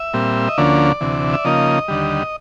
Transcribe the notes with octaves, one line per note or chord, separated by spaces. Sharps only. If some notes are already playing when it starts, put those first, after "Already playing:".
Already playing: E5
A#2 G3 C4
D#5
D2 D3 F3 A#3 C#4 D5
D2 C3 E3
E5
C#3 F3 A#3 D#4 D#5
D#2 D3 G3